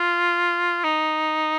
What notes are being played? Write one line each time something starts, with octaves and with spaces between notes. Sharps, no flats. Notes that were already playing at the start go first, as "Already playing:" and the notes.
Already playing: F4
D#4